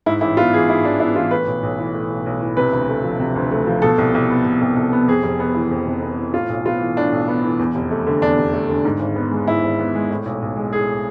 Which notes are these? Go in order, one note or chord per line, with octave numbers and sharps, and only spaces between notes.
G#2 E4
A1 E4
B3 F4
E3 G#4
G#2 E4
A1 D4
B3 E4
E3 F4
A2 B4
B1
B1
E3
A2
B1
B1
E3
C3 B4
D2
A3
F3
C3
D2
A3
F3
B2 A4
C2
C2
B3
B2
C2
C2
B3
F2 G#4
F1
B3
E3
F2
F1
B3
E3
A2 F4
B1
B3 F4
E3
A2 D4
B1
B3
E3
E2
F1
A3
D3
E2 D4
F1
A3
D3
G#2
G#1
B3
G#3
G#2 E4
G#1
B3
G#3
A2
B1
B1
G#3
A2 G#4